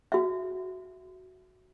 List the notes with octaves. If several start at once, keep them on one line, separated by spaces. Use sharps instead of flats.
F#4 E5